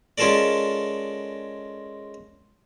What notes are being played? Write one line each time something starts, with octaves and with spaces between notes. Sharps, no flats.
G#3 C#4 F4 A4 A#4 D5